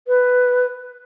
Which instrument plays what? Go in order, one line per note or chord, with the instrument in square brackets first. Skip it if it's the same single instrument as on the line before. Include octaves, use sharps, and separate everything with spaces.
[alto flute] B4